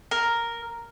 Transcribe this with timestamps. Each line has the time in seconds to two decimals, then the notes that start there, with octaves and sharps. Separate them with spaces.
0.11 A#4